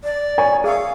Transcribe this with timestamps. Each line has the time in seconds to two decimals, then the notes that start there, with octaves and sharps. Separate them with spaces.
0.04 D5
0.38 A#4 C#5 G#5
0.64 G#4 E5 F5 C#6